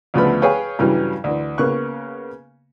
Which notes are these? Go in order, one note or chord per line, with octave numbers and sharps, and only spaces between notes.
D2 C#3 F3 A3 B3 B5
G#4 B4 C#5 F5 G5
G2 C#3 E3 F#3 G3
D2 E3
C#3 A#3 B3 C#6 F#6